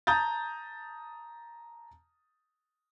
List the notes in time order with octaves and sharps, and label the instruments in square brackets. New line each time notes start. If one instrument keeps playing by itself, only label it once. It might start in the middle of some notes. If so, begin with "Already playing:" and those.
[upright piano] A5 A#5 D#6 G6 A6